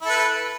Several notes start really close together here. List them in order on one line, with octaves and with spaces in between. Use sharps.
E4 A4 B4